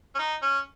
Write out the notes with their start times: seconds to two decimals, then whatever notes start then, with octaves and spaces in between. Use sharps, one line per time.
0.15 C#4
0.19 D#4
0.42 C#4